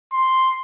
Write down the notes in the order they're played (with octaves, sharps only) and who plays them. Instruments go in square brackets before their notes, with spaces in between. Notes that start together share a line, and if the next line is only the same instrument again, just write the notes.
[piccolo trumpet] C6